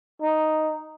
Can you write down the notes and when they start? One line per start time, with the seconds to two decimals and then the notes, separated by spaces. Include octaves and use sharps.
0.22 D#4